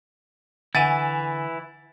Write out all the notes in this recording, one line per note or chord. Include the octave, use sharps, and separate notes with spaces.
D3 E3 E4 F#5 G#5 A6 D#7